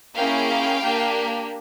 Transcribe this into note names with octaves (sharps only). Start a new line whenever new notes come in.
A#3 C#4 E4 G#4 F5 G5
A#3 D4 G4